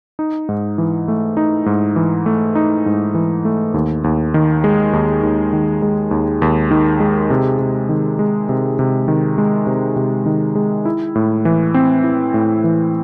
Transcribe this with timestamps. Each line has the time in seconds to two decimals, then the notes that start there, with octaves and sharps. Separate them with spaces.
0.19 D#4
0.49 G#2
0.78 E3
1.08 A3
1.37 D#4
1.66 G#2
1.96 E3
2.26 A3
2.55 D#4
2.86 G#2
3.14 E3
3.45 A3
3.74 D#2
4.04 D#2
4.34 D#3
4.64 G#3
4.93 D#2
5.23 D#2
5.53 D#3
5.82 G#3
6.11 D#2
6.42 D#2
6.71 D#3
7.00 G#3
7.30 C3
7.59 C3
7.89 D#3
8.19 G#3
8.49 C3
8.79 C3
9.08 D#3
9.38 G#3
9.67 C3
9.96 C3
10.26 D#3
10.55 G#3
10.85 E4
11.15 A2
11.45 E3
11.74 C4
12.04 E4
12.34 A2
12.64 E3